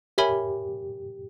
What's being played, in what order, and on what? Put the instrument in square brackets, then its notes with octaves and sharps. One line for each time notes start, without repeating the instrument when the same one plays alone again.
[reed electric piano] G4 [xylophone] A#4 C#5 E5 G#5 B5